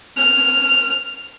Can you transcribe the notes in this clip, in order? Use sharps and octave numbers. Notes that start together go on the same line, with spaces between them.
F6